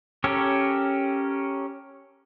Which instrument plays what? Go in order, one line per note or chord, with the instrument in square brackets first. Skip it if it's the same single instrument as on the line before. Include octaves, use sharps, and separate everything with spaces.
[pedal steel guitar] C#4 G4 A4 A#4 C#5